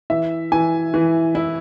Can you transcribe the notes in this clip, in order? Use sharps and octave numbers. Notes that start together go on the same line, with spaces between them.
E3 E5
E3 G#5
E3
E4